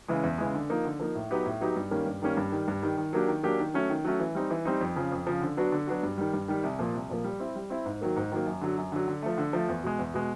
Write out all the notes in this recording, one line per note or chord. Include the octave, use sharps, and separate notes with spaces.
C#3 E3 G#3
E2
C#3 E3 G#3
D3
F3 A#3 D#4
D3
F3 A#3 D#4
A2
F#3 B3 D#4 G4
A2
F#3 B3 D#4 G4
G2
D#3 G3 A#3 C#4
G2
D#3 G3 A#3 C#4
G2
D#3 G3
G2
D#3 G3
D#3
F#3 A#3 D4 G4
D#3
F#3 A#3 D4 G4
D#3
F#3 A3 C#4
D#3
F#3 A3 C#4
E3
G3 C4 D#4
E3
G3 C4 D#4
F2
C#3 F3
F2
C#3 F3
D3
F#3 B3 D4 F#4
D3
F#3 B3 D4 F#4
G2
D#3 G3
G2
D#3 G3
C2
A#2 F3 A#3
C2
A#2 F3 A#3
G3
C4 E4
G3
C4 E4
G#2
D#3 F#3 A#3
G#2
D#3 F#3 A#3
F#2
D3 F#3
F#2
D3 F#3
D3
F3 A3
D3
F3 A3
E2
B2 G#3
E2
B2 G#3